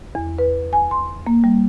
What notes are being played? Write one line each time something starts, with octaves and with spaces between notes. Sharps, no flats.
E2
B4
G#5
C6
A#3
G3